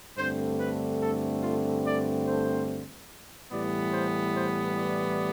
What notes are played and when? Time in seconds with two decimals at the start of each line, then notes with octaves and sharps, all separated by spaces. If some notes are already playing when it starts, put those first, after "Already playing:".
0.17 G2 D3 A3 C4 C5
0.59 B4
1.01 A4
1.43 F4
1.85 D5
2.26 C5
3.51 A2 E3 G3 B3 D5
3.93 C5
4.35 C5
4.77 D5